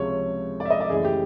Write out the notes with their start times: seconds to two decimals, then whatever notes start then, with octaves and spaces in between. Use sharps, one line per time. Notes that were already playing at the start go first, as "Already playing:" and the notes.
Already playing: C#2 C3 F3 G#3 C#5
0.60 D5
0.65 E5
0.70 D#5
0.80 D5
0.89 F#2 C#3 E3 A3 G#4
1.05 G4